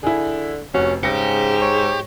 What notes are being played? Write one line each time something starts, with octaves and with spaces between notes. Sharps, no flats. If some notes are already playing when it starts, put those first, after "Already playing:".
D3 E4 G#4
F1 C#4 F#4
G#2 C#3 G4 A#6 C#7
C#5